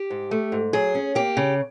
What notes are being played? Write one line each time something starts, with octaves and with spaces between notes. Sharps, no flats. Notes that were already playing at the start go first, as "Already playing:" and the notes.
Already playing: G4
G#2
A3
G#2
F#3 G#4
C#4
A#3 G4
C#3